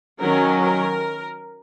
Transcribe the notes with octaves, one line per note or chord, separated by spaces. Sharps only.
D#3 F#3 C#4 A#4
A#4